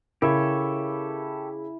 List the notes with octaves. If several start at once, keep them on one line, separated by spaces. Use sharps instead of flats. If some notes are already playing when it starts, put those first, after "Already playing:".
C#3 E4 G4 A4 A#4 C#5